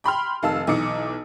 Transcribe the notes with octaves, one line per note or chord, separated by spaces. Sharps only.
G5 B5 C6 F6
F1 D#3 F5 A5 E6
B1 E3 D#4 D6 D#6 C#7